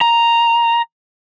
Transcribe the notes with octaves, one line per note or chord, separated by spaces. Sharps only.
A#5